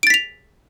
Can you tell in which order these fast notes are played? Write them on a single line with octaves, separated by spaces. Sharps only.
D7 A6 B6 F7